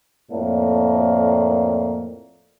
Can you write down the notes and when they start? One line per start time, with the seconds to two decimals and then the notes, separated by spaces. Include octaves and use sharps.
0.32 F2 A2 A#3 D5